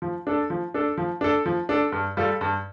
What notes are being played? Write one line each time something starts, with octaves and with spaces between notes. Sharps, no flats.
F3
D4 A4
F3
D4 A4
F3
D4 A4
F3
D4 A4
G2
G3 F4 A4
G2